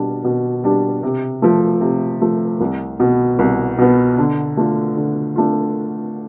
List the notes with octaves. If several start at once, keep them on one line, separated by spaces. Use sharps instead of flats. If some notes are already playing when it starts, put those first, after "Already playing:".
Already playing: B2 G3 D4
B2
G3 D4
C3
F3 A3
C3
F3 A3
C2
B2 B3
C2
B2 B3
D3
A3 D4 F4
D3
A3 D4 F4